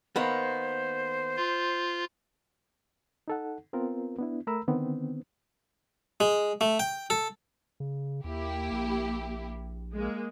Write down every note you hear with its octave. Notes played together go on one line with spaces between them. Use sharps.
D#3 A#3 B3 C5
F4
D#4 A4 F#5
B3 C4 F4 A#4
B3 D4 E4
A3 A#4 A#5 B5 E6
D3 D#3 B3 C4
G#3
A3
G5
A4
C#3
D#2 A#3 E4 G4
A#1
G#3 A#3